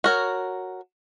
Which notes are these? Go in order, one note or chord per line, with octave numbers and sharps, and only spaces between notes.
F#4 A#4 C#5